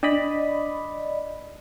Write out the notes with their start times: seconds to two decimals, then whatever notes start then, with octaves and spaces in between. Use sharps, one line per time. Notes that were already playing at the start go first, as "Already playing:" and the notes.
0.03 D4 D5 D#5 B5